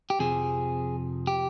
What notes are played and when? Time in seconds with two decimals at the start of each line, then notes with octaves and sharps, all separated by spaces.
0.10 G4
0.19 F2 C3 F3 G#4
1.27 G4